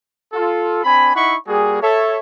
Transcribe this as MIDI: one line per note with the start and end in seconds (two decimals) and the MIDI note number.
0.33 0.82 65
0.33 0.82 69
0.83 1.12 60
0.83 1.12 62
0.83 1.12 80
0.83 1.12 83
1.14 1.34 63
1.14 1.34 64
1.14 1.34 76
1.14 1.34 78
1.14 1.34 83
1.14 1.34 85
1.47 1.81 55
1.47 1.81 58
1.47 1.81 66
1.47 1.81 68
1.82 2.19 69
1.82 2.19 73
1.82 2.19 76